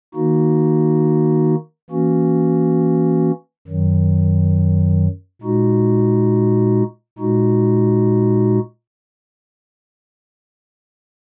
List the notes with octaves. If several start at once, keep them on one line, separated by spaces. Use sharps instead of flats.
D#3 A#3 D#4 F#4
E3 A#3 C#4 F#4
F#2 D#3 F#3
A#2 G#3 D#4 F#4
A#2 G#3 D#4 F#4